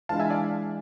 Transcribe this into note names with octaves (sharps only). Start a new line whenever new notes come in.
E3 G#3 D4 F4 F5 A5
E5 G#5
D5 F5